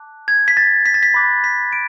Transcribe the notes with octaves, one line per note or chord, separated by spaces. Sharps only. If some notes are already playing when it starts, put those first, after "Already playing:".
Already playing: A5 D6 F#6
G#6
B6
A6
B6
A6
B6
B5 D6 F#6
B6
D7